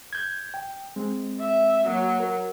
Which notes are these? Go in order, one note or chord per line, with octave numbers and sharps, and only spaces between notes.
G6 G#6
G5
G#3 C4
E5
F#3 A#3
A#4